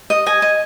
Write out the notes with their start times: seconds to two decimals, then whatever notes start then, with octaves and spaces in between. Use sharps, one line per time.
0.10 D#5
0.26 D#5 G#5
0.42 D#5